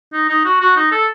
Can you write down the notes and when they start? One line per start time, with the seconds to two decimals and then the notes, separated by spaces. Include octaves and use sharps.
0.13 D#4
0.29 D#4
0.45 F#4
0.61 F#4
0.77 D#4
0.92 A4